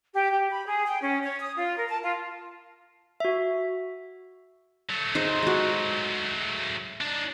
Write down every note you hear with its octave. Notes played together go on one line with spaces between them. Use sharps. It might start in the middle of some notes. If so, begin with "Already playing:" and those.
G4
G4
B5
G#4
G5
C#4
C#5
D#6
F4
A#4
A5
F4
F#4 E5
F#3 A3
D#4 G#4 C5
G#3 F#4
D4 D#4